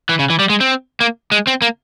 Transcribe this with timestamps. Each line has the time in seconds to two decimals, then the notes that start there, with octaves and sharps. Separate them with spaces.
0.09 E3
0.19 C#3
0.30 E3
0.39 G3
0.50 G#3
0.60 C4
1.00 A#3
1.32 G#3
1.47 C4
1.62 A#3